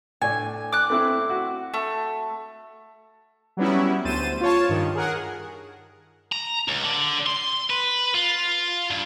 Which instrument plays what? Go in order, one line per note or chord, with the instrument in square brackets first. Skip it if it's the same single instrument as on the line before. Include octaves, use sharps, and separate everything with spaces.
[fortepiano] A2 D4 [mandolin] G#5
[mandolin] D6 F#6
[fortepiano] A3 C4 E4
F#4
[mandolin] A3
[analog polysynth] F#3 G3 B3 C#4 E4
D2 C5 A6 D#7 E7
F4 C#5 A5
G2 D#3
G#4 A#4 F#5
[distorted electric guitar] A#5
C#2
D3
C6
B4
F4
G2